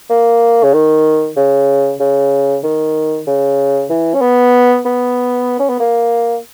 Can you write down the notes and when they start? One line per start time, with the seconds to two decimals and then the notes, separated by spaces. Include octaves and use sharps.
0.10 A#3
0.63 C#3
0.73 D#3
1.36 C#3
2.00 C#3
2.63 D#3
3.27 C#3
3.89 E3
4.14 C#4
4.21 B3
4.85 B3
5.59 C#4
5.69 B3
5.79 A#3